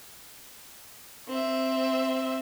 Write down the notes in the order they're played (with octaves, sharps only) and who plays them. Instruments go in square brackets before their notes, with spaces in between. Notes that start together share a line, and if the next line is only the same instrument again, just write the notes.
[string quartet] C4 E5